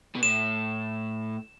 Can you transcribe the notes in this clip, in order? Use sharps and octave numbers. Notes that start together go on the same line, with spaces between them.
B2
A2 E7